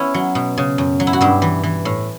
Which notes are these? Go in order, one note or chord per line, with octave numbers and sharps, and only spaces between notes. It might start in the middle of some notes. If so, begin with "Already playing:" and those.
Already playing: B3 C#4 E4
F#3
B2
C#3
F#2
F#3
E4
F#4
G2 E4 G4
E3
E3
A2